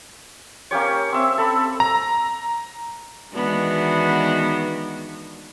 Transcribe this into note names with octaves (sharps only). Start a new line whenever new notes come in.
A#3 C#4 G4 C#5
C4 E5
A4 B5
A#5
D#3 E3 G#3 B3 D4 F#4